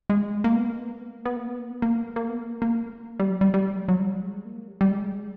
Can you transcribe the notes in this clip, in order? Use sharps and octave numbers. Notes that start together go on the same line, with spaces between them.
G#3
A#3
B3
A#3
B3
A#3
B3
A#3
B3
A#3
B3
A#3
B3
A#3
A#3
B3
A#3
A#3
G3
F#3
G3
G3
F#3
F#3
G3
G#3
A#3
G3
G3
G#3